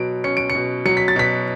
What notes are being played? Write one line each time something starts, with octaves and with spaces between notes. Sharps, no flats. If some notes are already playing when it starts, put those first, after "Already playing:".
Already playing: B2 F#3 D7
C#4 C#7
D7
C#7
B2
F#3 C#7
B6
A6
B2 B6